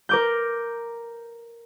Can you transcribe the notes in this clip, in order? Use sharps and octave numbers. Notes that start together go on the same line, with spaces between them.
A#4 D6 G6